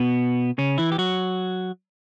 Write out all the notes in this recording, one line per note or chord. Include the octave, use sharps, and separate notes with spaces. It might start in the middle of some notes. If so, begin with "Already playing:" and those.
Already playing: B2 B3
C#3 C#4
E3 E4
G4
F#3 F#4